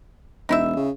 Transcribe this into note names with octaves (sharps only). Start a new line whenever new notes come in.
E1 D#4 E4 E5
C#3